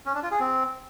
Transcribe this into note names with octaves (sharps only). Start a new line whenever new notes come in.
C#4
D4
F4
G#4
C4